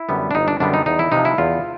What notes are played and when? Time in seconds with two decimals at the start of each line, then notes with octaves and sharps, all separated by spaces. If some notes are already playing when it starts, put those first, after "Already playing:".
Already playing: E4
0.09 F#2 D3 G3 B3
0.31 D4
0.35 G1 D#4
0.48 D4
0.60 F#2 D3 G3 B3 D4
0.74 D#4
0.86 E2 D#4
0.99 E4
1.12 C3 F3 D#4
1.25 E4
1.38 E2 F4